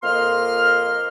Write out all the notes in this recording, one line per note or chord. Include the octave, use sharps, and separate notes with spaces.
F2 A#3 D#5 C6 F6